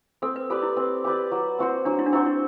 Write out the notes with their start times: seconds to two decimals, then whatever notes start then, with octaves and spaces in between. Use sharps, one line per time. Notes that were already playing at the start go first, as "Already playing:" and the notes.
0.22 C4 A4
0.36 B4
0.50 G4 A4 B4 D5
0.63 E4
0.77 C4
1.04 G4 B4 D5
1.31 F#3
1.59 C4 F#4 C5
1.85 F#3 D4
1.99 E4
2.06 D4
2.12 C4 E4 F#4 C5
2.26 E4